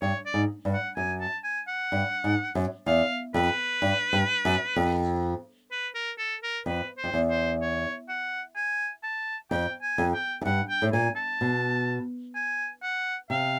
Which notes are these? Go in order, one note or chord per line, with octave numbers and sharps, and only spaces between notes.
G2 C#5
D5
G#2
G2
F#5
F#2 G#5
A5
G#5
F#5
G2
G#2
F#2
E2 F5
F2 B4
G2
G2
F#2
F2
B4
A#4
A4
A#4
F2 B4
C5
F2
E2
C5
C#5
F#5
G#5
A5
F2 G5
G#5
F2
G5
F#2
G2 F#5
G5
A2
A#2 G#5
A5
B2
G#5
F#5
C3 F5